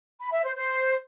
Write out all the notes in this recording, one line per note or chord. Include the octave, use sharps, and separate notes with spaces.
B5
E5
C5
C5